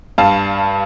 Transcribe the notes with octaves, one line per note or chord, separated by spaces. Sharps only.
G2 F5 A5